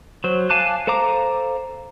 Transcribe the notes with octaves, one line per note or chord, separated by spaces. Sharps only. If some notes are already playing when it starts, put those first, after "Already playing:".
F#3 C5
F5 G#5 A5 D6 F#6
A4 C5 F5 A#5 D6